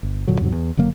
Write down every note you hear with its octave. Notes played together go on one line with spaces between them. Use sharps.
G1
E1 A#2 D3 F#3
E2 G#2 C3 F#3
E2
F#1 D3 F#3 A#3